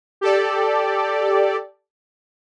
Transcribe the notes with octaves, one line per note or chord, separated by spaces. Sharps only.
G4 A4 D5